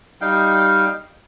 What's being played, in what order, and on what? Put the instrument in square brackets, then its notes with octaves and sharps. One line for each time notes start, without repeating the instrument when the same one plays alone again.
[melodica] G3 D#4 F5 G5